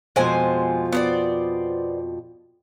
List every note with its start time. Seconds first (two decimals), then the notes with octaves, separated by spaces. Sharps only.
0.16 F2 B2 F3 G#3 C5 G#5
0.92 B3 C5 D5